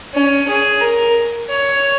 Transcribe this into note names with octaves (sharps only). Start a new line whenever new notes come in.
C#4
G#4
A#4
C#5